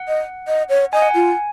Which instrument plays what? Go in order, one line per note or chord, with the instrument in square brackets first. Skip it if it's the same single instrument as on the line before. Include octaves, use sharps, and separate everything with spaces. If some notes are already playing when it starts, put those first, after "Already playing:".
Already playing: [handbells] F#5
[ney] D#5
D#5
C#5
[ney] D#5 [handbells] G#5
[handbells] F#5
[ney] F4 [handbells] G#5